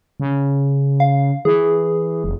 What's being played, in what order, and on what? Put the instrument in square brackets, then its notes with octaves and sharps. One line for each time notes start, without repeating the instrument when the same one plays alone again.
[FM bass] C#3
[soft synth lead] F5
[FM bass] E3 [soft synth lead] G#4
[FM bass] F1